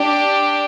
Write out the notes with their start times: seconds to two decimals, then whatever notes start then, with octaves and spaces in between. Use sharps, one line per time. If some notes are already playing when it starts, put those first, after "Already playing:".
Already playing: D4 G4